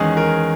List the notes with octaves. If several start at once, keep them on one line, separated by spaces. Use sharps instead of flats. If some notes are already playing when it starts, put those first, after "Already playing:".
Already playing: E2 D#3 G#3 C#4 G#4
A#4